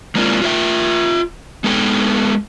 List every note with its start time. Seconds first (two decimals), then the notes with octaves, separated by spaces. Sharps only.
0.15 G#3 A#3 C4 D4 F4
0.42 F4 F#4 C#5 E5 G5
1.64 G#3 B3 A4 G5